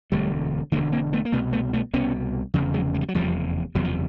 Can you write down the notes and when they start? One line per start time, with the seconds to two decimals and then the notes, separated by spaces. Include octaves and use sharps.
0.12 E1 D2 D3 G3 A3
0.72 E1 D2 D3 G#3 A#3
0.92 A#3 C4
1.13 A3 B3
1.25 A#3
1.32 C2 B2 A3 B3
1.53 A3 B3
1.73 A3 B3
1.94 C2 B2 B3 C#4
2.54 F1 E2 C#3
2.74 F#3 G#3
2.94 G#3
3.01 G3
3.09 F#3
3.15 F1 E2 C#3 F3 G3
3.75 F#1 E2 C3 F#3
3.84 F3